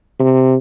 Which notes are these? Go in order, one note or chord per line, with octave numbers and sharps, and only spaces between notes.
C3